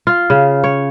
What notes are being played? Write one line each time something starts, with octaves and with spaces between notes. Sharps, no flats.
F4
C#3
C#5